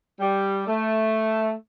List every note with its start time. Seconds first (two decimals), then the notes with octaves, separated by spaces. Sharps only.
0.20 G3
0.67 A3